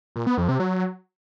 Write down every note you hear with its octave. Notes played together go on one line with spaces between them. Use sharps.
A#2
B3
F2
C3
F#3